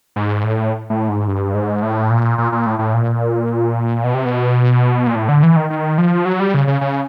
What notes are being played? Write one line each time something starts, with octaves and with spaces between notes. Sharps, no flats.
G#2
A2
A2
G#2
G2
G#2
A2
A#2
A#2
A#2
A2
A2
A#2
B2
C3
B2
A#2
A2
D3
E3
D#3
D#3
F3
F#3
G3
C#3
C#3
C#3